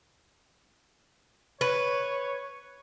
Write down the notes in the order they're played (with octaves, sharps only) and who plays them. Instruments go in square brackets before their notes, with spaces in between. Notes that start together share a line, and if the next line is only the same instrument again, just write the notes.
[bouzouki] B4 [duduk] C#5